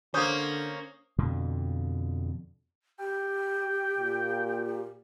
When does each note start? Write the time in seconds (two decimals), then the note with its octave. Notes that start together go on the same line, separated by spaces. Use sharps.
0.14 D3 A#3 C#4 C5 D#6 G6
1.18 F2 B2 D3
3.00 G4 G5
3.97 A#2